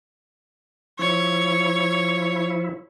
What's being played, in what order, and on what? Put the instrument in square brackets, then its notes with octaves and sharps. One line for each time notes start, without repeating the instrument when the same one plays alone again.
[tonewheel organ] F3 E4 [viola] C#5